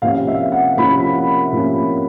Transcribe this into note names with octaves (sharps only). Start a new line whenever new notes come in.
C3 F3 A#3 C#4 F5
E5
F#5
C3 F3 A#3 C#4 B5
C3 F3 A#3 C#4